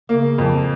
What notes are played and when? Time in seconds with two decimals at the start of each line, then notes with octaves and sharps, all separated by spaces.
0.09 C#3 A#3
0.38 F2